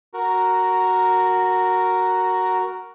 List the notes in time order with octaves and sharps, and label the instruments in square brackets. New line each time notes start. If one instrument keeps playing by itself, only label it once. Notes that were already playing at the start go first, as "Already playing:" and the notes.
[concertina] F#4 A#4